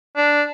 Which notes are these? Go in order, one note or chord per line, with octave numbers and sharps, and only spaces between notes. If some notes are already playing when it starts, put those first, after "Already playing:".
D4